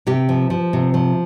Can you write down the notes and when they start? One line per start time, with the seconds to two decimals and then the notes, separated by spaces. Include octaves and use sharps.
0.07 C3 G4
0.29 F3
0.50 F3
0.73 C3
0.94 F3